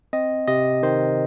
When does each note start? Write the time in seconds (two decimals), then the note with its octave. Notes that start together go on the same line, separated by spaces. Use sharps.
0.13 C4 D#5
0.48 C3 D#5
0.83 D#3 C5